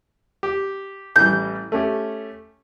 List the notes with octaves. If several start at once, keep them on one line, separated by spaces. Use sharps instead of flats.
G4
A1 E3 G3 G6
A3 C#4 G4